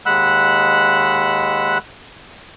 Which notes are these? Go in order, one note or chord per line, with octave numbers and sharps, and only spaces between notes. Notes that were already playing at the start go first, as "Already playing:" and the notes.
D#2 G#3 F#5 B5 E6 F#6